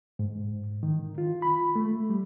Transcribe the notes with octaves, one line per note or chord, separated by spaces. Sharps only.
G#2
D#3
F4
B5
A3
G3